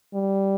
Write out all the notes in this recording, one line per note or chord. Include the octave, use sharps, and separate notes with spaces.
G3